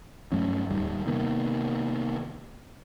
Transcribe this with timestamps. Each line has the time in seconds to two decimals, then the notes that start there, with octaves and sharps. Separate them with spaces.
0.32 G2 F#3 A3 C#4
0.70 D1 D#2 D#3 G3
1.06 C3 D#3 A#3 B3